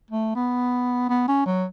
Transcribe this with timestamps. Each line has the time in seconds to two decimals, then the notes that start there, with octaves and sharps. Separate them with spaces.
0.11 A3
0.35 B3
1.09 B3
1.28 C#4
1.46 F#3